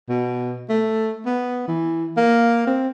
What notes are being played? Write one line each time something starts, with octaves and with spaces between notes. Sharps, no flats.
B2
A3
B3
E3
A#3
C4